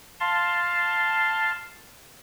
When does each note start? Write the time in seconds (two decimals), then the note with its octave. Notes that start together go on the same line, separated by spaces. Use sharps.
0.20 F5 A5 C6